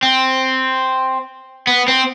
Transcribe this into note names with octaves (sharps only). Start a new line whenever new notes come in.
C4
B3
C4